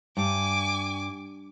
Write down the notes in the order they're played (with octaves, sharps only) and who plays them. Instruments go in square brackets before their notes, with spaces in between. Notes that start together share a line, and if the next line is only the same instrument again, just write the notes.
[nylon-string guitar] G2 [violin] G#5 D6